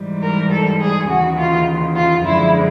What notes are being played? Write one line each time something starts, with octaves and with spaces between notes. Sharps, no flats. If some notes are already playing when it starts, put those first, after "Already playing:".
Already playing: G#2 E3 G3
A#4
A4
G#4
D#2 C#3 E3 F#4
F4
F4
F#2 D3 F3 G#3 E4